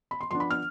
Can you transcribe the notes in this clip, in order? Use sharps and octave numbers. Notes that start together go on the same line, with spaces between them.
B5
C6
F3 B3 D4 C6
B5
F6